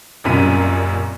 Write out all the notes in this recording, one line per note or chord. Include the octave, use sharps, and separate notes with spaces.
F#1 C2 F#2 A#2 B6 D#7